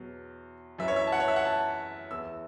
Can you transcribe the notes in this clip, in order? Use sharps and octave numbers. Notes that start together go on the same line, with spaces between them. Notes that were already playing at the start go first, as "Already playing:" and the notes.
Already playing: E2 B2 F#3
F#2 E3 E5
C#5
E5
A5
F#5
C#5
E5
F#5
A5
E2 E3 E6